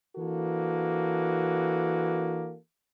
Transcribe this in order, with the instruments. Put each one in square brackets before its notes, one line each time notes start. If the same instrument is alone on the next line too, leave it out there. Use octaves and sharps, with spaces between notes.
[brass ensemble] E3 A#3 D4 F#4 A4